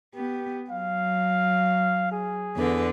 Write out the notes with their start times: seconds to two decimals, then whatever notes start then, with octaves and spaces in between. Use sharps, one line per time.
0.15 B3 G4
0.70 F#3 F5
2.12 G#4
2.57 E2 D3 B4